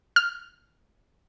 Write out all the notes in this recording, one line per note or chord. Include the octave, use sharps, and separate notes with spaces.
F6